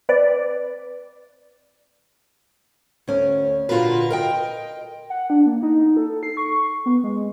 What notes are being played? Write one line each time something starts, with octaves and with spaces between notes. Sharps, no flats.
C4 B4 D5
D2 C#4
A#2 D3 F4 F#4 A#4 B4
A#4 D#5 G5
F#5
D4
A#3
D#4
A4
C7
C#6
B3
G#3